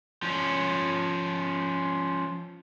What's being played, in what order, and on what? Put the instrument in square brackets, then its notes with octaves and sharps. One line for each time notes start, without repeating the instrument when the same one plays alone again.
[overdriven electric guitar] F3 C#4